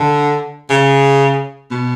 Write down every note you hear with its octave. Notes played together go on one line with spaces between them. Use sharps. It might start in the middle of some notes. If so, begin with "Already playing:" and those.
Already playing: D3
C#3
B2